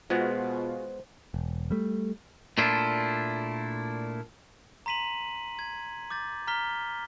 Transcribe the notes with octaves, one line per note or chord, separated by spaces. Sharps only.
B2 G#3 B3 F4 F#4 G#4 C5
E1
G3 A3
A#2 A3 D4 E4 F4
A#5 C6 B6 D#7 F#7
G#6
D6 G6 A6
A#5 F6 B6 G7